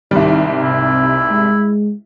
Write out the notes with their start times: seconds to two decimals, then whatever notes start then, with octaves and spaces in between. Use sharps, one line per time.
0.11 C2 G#2 D#3 G3
0.62 C3 E4
1.31 G#3